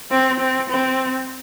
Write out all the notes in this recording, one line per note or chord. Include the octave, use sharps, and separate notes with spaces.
C4
C4
C4